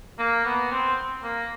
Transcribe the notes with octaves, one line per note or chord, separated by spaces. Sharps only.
A#3
B3
C4
A#3